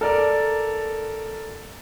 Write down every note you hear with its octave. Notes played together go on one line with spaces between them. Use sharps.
A4 A#4 D5